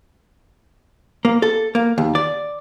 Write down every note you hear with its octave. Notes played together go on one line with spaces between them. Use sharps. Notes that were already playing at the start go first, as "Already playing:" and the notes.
A#3
A4
A#3
D#2
D5